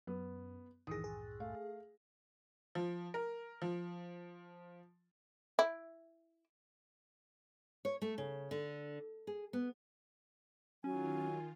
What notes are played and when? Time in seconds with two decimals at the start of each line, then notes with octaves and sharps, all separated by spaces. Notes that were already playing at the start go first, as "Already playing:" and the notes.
0.07 F#2 B3
0.87 C2 F#2 A2 D#3 E3 G#4 D#6 A#6
1.04 G#4
1.40 A3 F5
2.75 F3
3.14 A#4
3.62 F3
5.59 E4
7.85 C#5
8.02 A3
8.18 C#3
8.51 D3
9.27 G#4
9.53 B3
10.84 D#3 F#3 C#4 F4 G#5